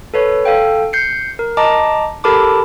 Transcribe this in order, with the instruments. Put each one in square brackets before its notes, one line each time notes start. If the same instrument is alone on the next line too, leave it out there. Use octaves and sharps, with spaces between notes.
[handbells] A4 B4 C#5
A4 F5 G5
G6 C7 C#7
A#4
D#5 A5 A#5 D6
G4 A4 A#4 A5 B5 D6